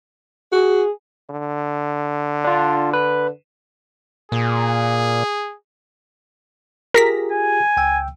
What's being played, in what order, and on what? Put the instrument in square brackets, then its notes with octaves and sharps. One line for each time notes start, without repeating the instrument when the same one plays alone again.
[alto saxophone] F#4 [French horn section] G#4
[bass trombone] D3
[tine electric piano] D4 F4
B4
[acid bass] A#2 [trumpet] G#4
[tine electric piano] F4 G4 G#4 [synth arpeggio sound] A#4 A#6 B6
[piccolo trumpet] G#5
[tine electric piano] C#2 G5 E6